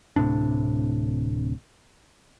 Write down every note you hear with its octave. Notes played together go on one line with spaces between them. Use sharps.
D1 A2 C3 D4